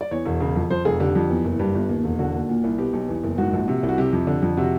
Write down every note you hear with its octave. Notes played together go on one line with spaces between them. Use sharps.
D5
E2 C#5
E1
C#3
F2
F2 C5
F1 G#4
D3 G4
F2
E2
F#1
G2 G4
G1
D#2
E1
D3 F#4
D#2
A#2
C2
B2 G4
B1
E2
F#1
G#2 F#4
A#1
C3
C2
F#4
C3 G4
F2
D3
F2
C3 F#4